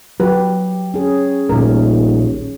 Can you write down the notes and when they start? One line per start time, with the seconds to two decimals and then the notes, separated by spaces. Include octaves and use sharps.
0.20 F#3 F#4 G4 B4
0.94 C#4 G#4
1.49 D#1 A#1 A3 A#4